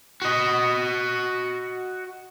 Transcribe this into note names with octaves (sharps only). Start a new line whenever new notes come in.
F#4 D#5